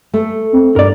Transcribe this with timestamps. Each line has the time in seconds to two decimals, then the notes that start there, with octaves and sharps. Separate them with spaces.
0.14 A3
0.53 C4
0.76 G2 A#4 D5